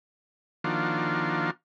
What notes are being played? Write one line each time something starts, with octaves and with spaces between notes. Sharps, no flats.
D#3 F3 A#3 D4 F4 F#4